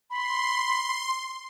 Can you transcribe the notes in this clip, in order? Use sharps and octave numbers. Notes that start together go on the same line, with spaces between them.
B5 C6